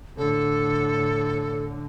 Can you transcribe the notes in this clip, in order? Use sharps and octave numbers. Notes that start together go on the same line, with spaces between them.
A2 D3 A4